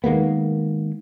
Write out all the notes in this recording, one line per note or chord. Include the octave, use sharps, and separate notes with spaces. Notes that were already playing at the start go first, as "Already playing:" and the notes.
D#3 G#3 A#3 B3